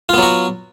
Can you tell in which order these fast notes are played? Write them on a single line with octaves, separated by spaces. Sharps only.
F4 B3 F#3 F#4